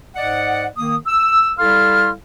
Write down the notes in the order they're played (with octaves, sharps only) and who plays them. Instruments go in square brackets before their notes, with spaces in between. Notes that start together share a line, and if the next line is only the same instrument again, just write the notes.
[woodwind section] G#2 D5 D#5 F#5
D#3 A#3 D#6
E6
G3 E4 A4 F5 C6 F6